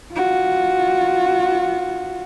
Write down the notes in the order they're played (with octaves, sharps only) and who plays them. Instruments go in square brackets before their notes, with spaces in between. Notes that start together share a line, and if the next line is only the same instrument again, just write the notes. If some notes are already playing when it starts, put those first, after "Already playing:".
[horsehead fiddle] F4 F#4